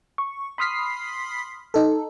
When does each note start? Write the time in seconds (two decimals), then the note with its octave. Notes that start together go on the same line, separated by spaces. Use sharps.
0.18 C#6
0.58 B5 C6 D#6 F6 B6 C7
1.74 D#4 A4